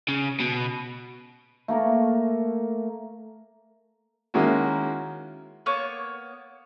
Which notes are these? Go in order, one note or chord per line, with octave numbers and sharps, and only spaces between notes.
C#3
B2
A3 A#3 A4 A#4
D#3 G#3 A#3 C#4 E4 F#4
A#3 B3 C#5